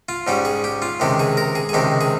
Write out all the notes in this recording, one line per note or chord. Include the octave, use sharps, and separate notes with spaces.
F4
G#2 G3 C#4 G4
G#4
G4
F4
C#2 C3 D#3 G#3 G4
G#4
A#4
G#4
G#4
C#2 C3 D#3 G#3 G4
G#4